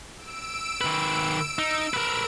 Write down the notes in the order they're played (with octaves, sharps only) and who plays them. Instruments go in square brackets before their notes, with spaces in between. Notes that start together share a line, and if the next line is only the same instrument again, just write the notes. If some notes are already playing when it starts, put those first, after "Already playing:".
[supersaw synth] E6 D7
[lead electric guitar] D#3 B4
D#4
A#4 B4